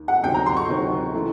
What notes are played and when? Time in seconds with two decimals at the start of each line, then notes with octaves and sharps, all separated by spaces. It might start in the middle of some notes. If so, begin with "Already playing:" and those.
Already playing: D#2
0.08 F#5
0.23 D2 C3 D#3 F#3 G5
0.34 A#5
0.46 C6
0.57 C#6
0.69 D2 C3 D#3 F#3
1.13 C#3 E3 A3